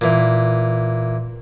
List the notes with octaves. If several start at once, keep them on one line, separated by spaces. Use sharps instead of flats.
A#2 E3